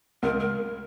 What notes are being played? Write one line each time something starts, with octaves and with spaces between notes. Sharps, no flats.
C#2 A#4
A#4